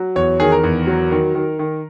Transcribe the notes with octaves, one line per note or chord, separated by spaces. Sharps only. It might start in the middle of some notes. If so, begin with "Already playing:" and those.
Already playing: F#3
E2 C#5
D#3 G#4
A#4
E2
F#3
D#3
D#3
D#3